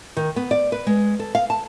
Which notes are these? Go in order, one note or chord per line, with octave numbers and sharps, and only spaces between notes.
D#3
B3
D5
B4
G#3
A4
F5
A5